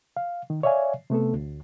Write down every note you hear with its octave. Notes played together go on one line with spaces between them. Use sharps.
F5
D#3
C#5 D5 E5 F5 G#5
C3 A3 B3 A4
D2